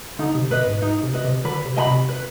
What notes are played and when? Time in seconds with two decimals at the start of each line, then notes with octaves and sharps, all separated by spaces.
0.19 D3 D#4
0.35 C3
0.51 B2 B4 D#5
0.67 G#2
0.82 G#2 D#4
1.03 C3
1.13 B4 D#5
1.25 C3
1.45 D3 B4
1.65 C3
1.76 D#5 G#5 B5
1.87 C3
2.09 B4